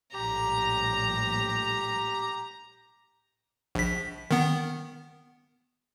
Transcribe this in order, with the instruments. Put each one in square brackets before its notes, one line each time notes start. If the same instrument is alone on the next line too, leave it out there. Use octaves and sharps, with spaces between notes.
[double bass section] A#1 A2 G3 [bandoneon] G4 [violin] A#5
[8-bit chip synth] A#1 B6
D#3 B3